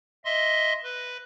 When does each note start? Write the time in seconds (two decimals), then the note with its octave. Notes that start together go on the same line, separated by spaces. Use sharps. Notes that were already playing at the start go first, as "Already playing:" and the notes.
0.25 D#5 E5 C6
0.83 B4